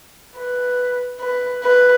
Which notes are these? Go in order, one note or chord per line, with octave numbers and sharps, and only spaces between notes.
B4
B4
B4